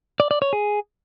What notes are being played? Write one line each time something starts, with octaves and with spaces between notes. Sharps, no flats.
D5
D5
C#5
G#4